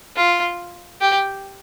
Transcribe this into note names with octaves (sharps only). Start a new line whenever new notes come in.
F4
G4